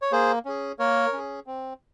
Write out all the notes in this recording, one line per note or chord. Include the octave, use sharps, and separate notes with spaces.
C#5
A#3 G#4 C5
C#4 G#4
A#3 A#4 C#5
C#4 G#4
C4